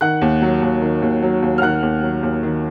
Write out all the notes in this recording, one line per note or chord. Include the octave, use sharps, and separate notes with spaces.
D#3 F#5 F#6
D#2
F#3
D#2
D#3
D#2
F#3
D#2
F6
D#3 F#5 F#6
D#2
F#3
D#2
D#3